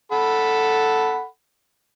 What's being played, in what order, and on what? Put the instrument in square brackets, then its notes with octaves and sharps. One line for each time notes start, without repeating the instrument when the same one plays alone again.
[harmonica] A4 F#5 B5